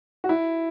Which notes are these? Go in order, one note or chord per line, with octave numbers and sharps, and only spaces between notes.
F#4
E4